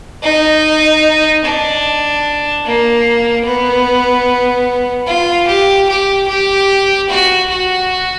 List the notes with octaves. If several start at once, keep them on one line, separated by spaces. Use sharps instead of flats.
D#4
D4
A#3
B3
F4
G4
G4
G4
F#4
F#4